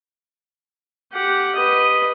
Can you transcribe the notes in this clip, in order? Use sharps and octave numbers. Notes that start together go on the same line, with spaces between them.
G4 F#5
B4 D#5